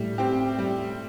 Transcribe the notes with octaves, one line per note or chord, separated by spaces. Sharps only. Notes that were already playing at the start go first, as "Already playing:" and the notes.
Already playing: A2 G3
C4 G4
G3